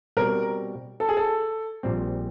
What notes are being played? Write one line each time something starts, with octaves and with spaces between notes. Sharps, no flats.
B2 G3 C4 A#4
A4
G#4
A4
A#1 A#2 G3 C4